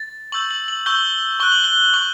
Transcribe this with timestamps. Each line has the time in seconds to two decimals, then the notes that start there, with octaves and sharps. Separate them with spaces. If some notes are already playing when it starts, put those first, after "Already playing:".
Already playing: A6
0.32 C#6 E6 G6 F#7
0.51 F#7
0.68 F#7
0.86 C#6 E6 G6 G7
1.40 C#6 F#6 G7
1.52 F#7
1.64 G7
1.94 C#6 F#6 F#7